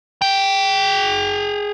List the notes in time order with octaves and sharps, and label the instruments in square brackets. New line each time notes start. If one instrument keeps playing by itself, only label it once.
[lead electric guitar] G#4 G5